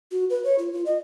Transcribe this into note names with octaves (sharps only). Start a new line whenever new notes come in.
F#4
B4
C#5
F4
F4
D#5